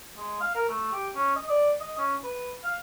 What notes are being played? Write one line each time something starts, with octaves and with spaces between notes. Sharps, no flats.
G#3
F5
A#4
A3
G4
C#4
D#5
D5
D#5
C#4
B4
F5